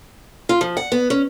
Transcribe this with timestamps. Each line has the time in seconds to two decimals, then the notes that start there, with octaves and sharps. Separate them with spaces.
0.49 F4
0.61 F3
0.77 F#5
0.92 B3
1.10 C#4